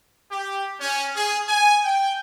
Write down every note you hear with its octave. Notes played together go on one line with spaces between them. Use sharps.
G4
C#4
G#4
G#5
G5